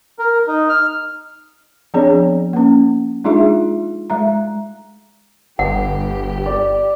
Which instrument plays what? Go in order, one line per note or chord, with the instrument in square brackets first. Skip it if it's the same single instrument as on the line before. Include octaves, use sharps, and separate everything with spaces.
[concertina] A#4
D#4
F6
[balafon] F3 B3 C4 D4 G#4 C#5
A#3 C#4
G#3 D4 D#4 F4 G#4 E5
G#3 E5 A#5
[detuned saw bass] G1 [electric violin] G4 [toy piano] F#5
[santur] D5